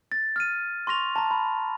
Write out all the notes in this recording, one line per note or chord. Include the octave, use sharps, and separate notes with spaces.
A6
F6 A6 D#7
C6 C#6 A#6 F7
A5 A#5
B5